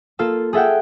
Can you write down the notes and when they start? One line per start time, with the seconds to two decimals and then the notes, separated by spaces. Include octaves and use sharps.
0.19 A#3 F4 A4 A5
0.53 G#4 A4 E5 F#5 G5